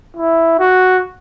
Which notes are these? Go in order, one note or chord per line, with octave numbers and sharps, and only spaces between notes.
E4
F#4